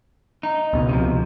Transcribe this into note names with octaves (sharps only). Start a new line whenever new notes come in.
D#4
C#2 B2
C3 F3